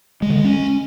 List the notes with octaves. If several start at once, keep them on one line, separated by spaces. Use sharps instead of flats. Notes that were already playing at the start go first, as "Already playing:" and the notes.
G#3
D3
G#3
C#4